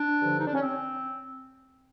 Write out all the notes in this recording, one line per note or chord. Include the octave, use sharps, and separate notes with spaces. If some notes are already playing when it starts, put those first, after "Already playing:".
Already playing: D4
G2 D3 F3
D#4
D4
C#4
C4